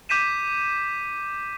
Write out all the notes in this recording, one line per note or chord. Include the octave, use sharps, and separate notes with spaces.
D6 G6 B6 D#7 E7